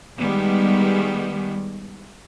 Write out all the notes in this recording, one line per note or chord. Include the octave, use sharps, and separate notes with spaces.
D#3 G3 G#3 B3